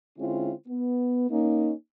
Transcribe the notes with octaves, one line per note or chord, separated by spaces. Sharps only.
D3 G#3 C4 C#4 E4 F4
B3
A#3 C#4 D#4